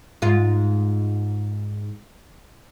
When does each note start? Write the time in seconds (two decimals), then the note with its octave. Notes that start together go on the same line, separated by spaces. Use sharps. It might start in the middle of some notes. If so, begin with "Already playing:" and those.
0.22 G#2 F4